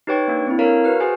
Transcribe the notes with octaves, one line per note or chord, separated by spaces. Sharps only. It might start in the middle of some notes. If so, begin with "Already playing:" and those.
D#4 G4 B4 C#5 G5 C#6
A#3 D4
C4 E4
A4 A#4 C#5 F5 A#5
F#4 B4 F6
F#4 G#4 C5 G#5